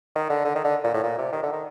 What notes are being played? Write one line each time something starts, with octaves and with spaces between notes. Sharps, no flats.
D#3
D3
D3
D#3
D3
A#2
A2
A#2
C3
D#3
D3
D#3